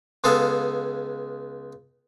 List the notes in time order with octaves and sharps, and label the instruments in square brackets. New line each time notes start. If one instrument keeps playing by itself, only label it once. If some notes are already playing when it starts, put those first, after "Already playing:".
[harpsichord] C#2 G#3 B3 G#4 A4 F5